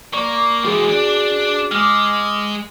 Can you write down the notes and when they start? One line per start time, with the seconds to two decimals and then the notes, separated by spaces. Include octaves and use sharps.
0.13 A#3 D5 C#6
0.65 E3 G#3 F#4 G#4
0.89 D4 D5
1.71 G#3 D6 F6